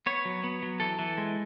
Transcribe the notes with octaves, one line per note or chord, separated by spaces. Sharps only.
B3 C#5
F#3
B3
F#3
E3 A4
E3
G#3